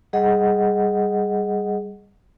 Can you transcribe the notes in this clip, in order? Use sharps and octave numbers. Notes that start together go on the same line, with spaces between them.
G3 G#4 D#5 F#5